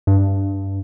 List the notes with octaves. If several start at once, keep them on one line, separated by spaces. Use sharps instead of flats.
G2